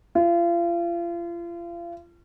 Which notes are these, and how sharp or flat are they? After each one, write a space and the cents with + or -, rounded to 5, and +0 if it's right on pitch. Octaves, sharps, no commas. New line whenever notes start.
F4 -35